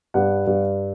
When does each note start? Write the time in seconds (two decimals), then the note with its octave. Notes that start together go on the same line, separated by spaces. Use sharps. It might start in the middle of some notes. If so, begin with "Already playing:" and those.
0.14 G2 F#5
0.47 G2